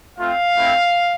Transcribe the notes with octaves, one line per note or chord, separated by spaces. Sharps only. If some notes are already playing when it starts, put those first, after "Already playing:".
A3 C4 F4 F5
A3 C4 E4